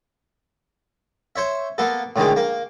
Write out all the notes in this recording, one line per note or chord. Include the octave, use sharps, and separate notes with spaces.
C5 C#5 E5
A#3 B3 A4
A2 D3 D#3 G#3
A#3